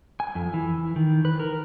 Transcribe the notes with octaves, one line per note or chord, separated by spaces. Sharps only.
G#5
F2
E3
D#3
B4
A#4